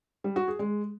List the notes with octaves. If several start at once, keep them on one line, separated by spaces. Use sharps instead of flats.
G3
F#4
G#4
G#3